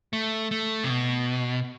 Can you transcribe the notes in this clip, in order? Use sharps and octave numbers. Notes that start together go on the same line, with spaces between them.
A3
A3
C3
B2